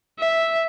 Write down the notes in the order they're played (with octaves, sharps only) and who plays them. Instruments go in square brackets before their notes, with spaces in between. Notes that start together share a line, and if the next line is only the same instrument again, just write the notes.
[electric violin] E5